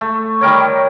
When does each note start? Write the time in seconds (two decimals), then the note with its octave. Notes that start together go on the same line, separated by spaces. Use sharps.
0.01 A3
0.41 D#3 G3 A#4 C#5